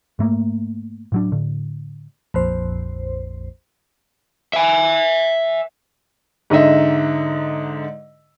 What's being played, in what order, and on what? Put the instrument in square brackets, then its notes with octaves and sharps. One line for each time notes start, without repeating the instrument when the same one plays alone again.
[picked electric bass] G#2 A3 A#3
A2 F#3 D4
A2 D3
[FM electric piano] A#1 F2 C5
[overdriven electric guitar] E5 G#5
[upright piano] G#2 D3 D#4 D#5 E5